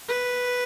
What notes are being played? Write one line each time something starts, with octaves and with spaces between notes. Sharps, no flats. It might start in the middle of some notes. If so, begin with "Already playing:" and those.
B4